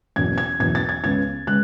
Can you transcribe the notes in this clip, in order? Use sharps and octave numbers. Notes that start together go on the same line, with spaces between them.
F#1 E2 B2 G#6
G#6
F#1 E2 B2 G#6
A6
G#6
C#2 C#3 G#3 B3 G#6
C#3 G#3 B3 F#6